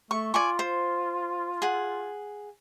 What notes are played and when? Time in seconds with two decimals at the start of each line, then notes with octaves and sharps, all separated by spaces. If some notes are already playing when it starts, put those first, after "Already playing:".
0.11 A3 C#6
0.34 F4 D5 G#5 C#6
0.59 C5
1.62 G#4 F#5